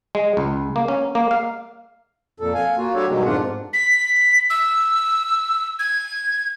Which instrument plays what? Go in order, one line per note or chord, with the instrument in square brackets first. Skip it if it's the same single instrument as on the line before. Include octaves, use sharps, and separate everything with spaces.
[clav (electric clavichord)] G#3
C#2
A#3
C#4
A#3
F5
[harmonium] F2 A#2 A4
F5 G#5
A#3 F4 F#4
G3 D4 F#4 G4 A4 C#5
G2 B2 D#3 F#3 G#3
F2 G#2 D4 F4 F#5
[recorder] B6
E6
G#6